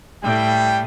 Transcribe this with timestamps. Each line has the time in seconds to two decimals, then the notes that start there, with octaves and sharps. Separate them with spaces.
0.24 A2 G3 G5